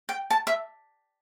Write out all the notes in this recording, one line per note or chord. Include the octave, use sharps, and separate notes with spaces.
G5
A5
E5